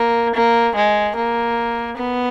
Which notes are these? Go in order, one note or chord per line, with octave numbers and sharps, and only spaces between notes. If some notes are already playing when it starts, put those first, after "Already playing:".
Already playing: A#3
A#3
G#3
A#3
B3